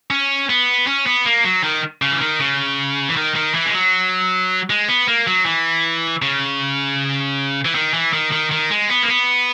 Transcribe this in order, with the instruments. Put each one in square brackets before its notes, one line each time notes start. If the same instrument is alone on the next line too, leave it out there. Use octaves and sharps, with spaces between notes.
[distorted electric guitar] C#4
B3
C#4
B3
A#3
F#3
D#3
C#3
E3
D#3
C#3
E3
D#3
D#3
E3
G#3
F#3
G#3
B3
A#3
F#3
E3
C#3
E3
D#3
E3
D#3
D#3
D#3
G#3
B3
A#3
B3